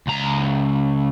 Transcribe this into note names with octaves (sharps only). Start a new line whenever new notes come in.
C#2 A#5